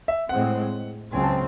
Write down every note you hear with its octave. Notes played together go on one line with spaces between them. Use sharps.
E5
A2 G#3 C4 F#5
C#2 C#3 F#3 C4 G#5
A5